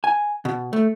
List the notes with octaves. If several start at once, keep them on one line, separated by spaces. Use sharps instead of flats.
G#5
B2
A3